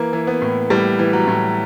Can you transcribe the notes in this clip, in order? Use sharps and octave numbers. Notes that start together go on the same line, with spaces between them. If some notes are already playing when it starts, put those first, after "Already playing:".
Already playing: E3 A#3
E3
B3
A2
A2 G3
E3
F#3
A2